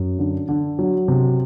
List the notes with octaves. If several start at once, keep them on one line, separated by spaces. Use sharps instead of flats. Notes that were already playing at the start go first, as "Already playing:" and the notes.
Already playing: F#2
D3
D3
F#3
C3